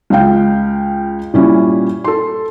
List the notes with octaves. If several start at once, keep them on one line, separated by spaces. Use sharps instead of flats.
C#2 F4 F5 G5
A#2 G3 C#4 E4
A4 C6